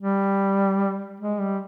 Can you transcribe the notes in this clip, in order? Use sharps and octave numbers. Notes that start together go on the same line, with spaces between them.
G3
G#3
G3